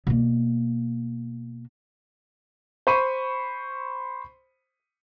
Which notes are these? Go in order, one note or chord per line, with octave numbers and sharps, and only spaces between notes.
B2 A#3
C5 B5 C#6 D#7